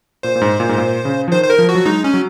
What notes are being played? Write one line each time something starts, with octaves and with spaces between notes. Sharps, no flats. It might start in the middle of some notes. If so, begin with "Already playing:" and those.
A#2 C5
A#2
G#2
A#2
G#2
A#2
C#3
F3
D#3 C5
C5
A#4
F3
F#4
F#3
G#3 D#4
C#4
F#3